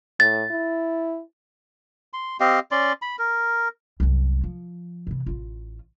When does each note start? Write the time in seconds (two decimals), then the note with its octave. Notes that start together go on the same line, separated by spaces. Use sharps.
0.20 A2 A6
0.51 E4
2.13 C6
2.40 C4 G4 D#5 F5
2.71 C#4 D5 C6
3.02 B5
3.19 A#4
4.00 C2 F#2
4.43 F3
5.07 C3 E3
5.26 A1 F4